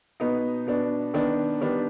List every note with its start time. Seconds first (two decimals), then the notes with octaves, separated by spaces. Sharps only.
0.20 B2 B3 D#4
0.66 B2 B3 D4
1.14 D#3 B3 D4
1.61 D#3 G3 B3 D4